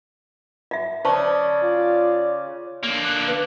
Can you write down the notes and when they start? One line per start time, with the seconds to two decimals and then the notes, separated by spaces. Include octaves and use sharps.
0.71 D#5 E5
1.05 C#3 C5 D5 A5 C#6
1.63 F4
2.84 D3 A#3
3.04 F#6
3.27 B4